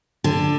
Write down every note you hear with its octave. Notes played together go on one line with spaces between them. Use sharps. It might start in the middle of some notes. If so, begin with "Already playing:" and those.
D3